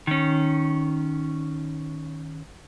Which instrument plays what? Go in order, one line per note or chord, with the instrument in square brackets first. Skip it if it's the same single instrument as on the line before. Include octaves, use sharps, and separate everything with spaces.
[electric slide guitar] D#3 C#4